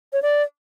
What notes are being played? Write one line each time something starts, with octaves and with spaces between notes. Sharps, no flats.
C#5
D5